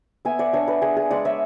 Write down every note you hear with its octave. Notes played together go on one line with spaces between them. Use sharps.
B3 E5 G#5
D5 F#5
D4 C#5 E5
B4 D5
D4 G#4
G#4
G#3 D5 F#5
C#5 E5